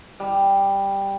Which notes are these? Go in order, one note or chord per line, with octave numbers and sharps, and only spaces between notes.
G3